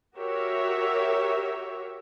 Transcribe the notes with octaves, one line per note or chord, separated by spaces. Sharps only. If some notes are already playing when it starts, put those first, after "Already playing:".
F#4 G4 A#4 C#5 E5